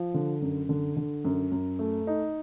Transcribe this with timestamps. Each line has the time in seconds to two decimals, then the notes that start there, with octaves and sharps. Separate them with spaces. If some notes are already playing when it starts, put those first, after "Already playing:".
Already playing: F3
0.14 D3
0.42 F#2
0.69 D3
0.97 D3
1.25 F#2
1.52 F#2
1.79 A3
2.07 D#4